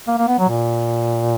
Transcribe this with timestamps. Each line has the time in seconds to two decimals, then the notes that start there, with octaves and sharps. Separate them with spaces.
0.08 A#3
0.18 A#3
0.28 B3
0.39 F#3
0.49 A#2